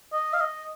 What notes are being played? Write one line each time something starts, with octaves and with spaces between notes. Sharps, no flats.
D#5
F5
D#5